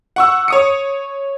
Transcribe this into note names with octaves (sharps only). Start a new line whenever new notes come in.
F#5 C#6 E6
C#5 D#6 C#7